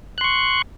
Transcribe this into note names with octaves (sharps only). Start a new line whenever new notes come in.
C6 C#6 F#6